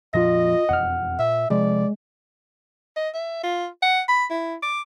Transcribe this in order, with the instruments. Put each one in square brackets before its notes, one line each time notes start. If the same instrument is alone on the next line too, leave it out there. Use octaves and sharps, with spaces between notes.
[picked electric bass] F2 A#2 F3 [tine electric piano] F4 A#6 [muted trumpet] D#5
[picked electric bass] E1 F2 [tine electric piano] F#5 F6
[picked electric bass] A#2 [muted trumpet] E5
[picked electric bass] C3 F3 [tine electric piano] G#3 [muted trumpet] D5
[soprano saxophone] D#5
E5
F4
F#5
B5
E4
D6